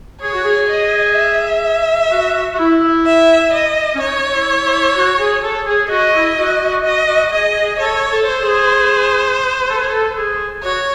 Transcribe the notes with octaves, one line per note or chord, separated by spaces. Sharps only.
G#4 C#5
F#4
G#4
D#5
E5
F#4
F#4
E4
E5
D#5
C#4
D#4 C#5
E4
E4
F#4
G#4
A4
G#4
G#4
F#4 D#5
E4
F#4
F#4
F#4 D#5
F#4
G#4 D#5
G#4
A4 C#5
A4
C5
G#4
A4
G#4
A4
G#4
F#4 C#5